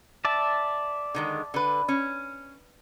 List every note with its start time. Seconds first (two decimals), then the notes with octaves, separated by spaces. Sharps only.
0.25 D5 E5 A5
1.14 D3 D#3 G#3
1.54 D3 B4
1.88 C#4